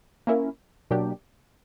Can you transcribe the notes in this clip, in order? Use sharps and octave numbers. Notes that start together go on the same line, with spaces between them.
A#3 C#4 E4 A#4
B2 F#3 A#3 D4 G4